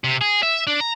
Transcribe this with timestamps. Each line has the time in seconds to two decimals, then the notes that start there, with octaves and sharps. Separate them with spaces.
0.04 C3
0.21 G#4
0.43 E5
0.67 D4
0.80 A#5